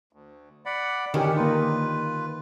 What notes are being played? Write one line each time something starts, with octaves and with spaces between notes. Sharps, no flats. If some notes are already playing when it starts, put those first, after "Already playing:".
D2
D5 F#5 B5
F2 D3 D#3 C#4 G4
A#3 D#4 F4 B4